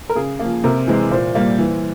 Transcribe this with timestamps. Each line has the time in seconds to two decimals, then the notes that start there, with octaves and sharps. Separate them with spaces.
0.10 A#4
0.16 C#3 G#4
0.39 A#3
0.45 F3
0.64 C3 A#4
0.87 E3 G#3 C4
1.11 A#2 C5
1.35 G3 A#3
1.59 E3